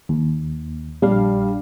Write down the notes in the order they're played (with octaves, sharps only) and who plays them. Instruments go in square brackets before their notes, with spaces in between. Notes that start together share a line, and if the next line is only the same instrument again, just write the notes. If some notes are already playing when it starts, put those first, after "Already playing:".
[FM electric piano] D#2
[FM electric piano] A#1 D4 F5 [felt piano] G3